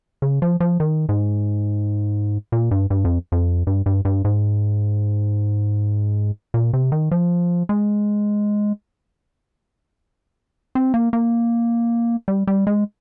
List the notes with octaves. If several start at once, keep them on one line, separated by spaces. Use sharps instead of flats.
C#3
F3
F3
D#3
G#2
A#2
G2
G2
F2
F2
G2
G2
G2
G#2
A#2
C3
D#3
F3
G#3
C4
A#3
A#3
G3
G3
G#3